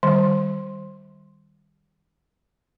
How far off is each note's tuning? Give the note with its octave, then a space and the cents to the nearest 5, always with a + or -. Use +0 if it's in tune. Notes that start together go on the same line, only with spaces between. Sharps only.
D#3 -10 G3 +0